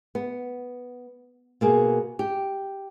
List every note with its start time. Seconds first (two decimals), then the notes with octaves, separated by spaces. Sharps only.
0.15 B3
1.61 B2 A#3 G#4
2.19 G4